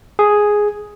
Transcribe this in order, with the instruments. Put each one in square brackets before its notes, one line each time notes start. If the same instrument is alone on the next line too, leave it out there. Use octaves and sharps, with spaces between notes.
[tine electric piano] G#4